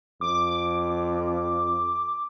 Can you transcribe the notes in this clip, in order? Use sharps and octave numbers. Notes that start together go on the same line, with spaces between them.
F2 D6